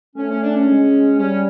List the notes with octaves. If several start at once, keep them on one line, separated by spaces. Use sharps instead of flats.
A3 C#4
C#4
D4
C#4
G#3
G3 C#4